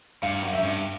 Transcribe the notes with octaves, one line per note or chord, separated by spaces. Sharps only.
G2 F5
F#2
E5
G2